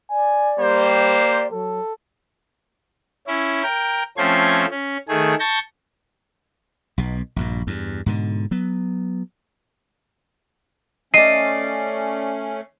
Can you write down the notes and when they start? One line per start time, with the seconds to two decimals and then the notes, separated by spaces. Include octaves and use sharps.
0.11 D5 G#5
0.59 G3 A#3 G4 C5
1.52 F#3 A4
3.27 C#4 E4
3.63 A#4 G5
4.17 F3 A3 C4 C#4 C6 G#6
4.71 C#4
5.08 D#3 A3 G#4
5.39 A5 C#6 G6 A#6
6.98 B1 B2
7.36 A#1 G2 A#2
7.67 E2 G2
8.06 G#2 B2 D3
8.51 F#3 B3
11.14 A3 C#4 D5 D#5 C7 D#7